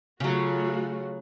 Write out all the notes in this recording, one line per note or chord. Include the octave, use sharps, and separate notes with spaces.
C#3 F#3 A3 F4 F#4